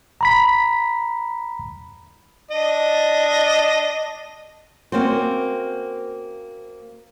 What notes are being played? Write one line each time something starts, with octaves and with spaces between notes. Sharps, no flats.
A#5 B5 B6
D4 D#5
A#3 C4 C#4 F#4 C5